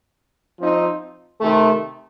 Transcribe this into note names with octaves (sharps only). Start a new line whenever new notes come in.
F3 C4 D#4
C3 D#3 A3